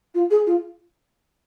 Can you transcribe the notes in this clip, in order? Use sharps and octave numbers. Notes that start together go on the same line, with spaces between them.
F4
G#4
F4